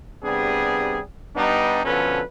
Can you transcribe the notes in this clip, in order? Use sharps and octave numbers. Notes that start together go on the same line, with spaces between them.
C3 G3 B3 D4 G#4
G2 G3 B3 D4 D#4
B2 D3 F3 C#4 A4 B4